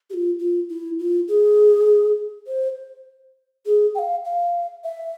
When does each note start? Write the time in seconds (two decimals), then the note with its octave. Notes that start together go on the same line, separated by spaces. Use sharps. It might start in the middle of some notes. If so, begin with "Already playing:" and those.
0.10 G4
0.14 F4
0.39 F4
0.69 E4
0.99 F4
1.28 G#4
2.47 C5
3.66 G#4
3.95 G5
3.99 F5
4.25 F5
4.84 E5